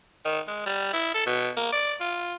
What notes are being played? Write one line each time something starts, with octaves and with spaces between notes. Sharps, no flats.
D#3
G#3
G3
E4
A4
B2
A#3
D5
F4